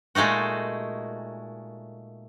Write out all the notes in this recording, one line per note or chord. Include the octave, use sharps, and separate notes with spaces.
A#2 G#3 A3 D#4 F#4